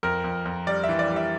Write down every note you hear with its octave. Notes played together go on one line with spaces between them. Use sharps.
F2 A#4
F2
F2
G3 D5
E5
E3
D5
G3
E5